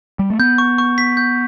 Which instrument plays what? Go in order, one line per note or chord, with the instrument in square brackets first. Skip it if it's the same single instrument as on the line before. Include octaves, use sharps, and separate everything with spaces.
[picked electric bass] G3
A3
[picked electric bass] B3 [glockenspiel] G6
[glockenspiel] C#6
C#6
B6
G6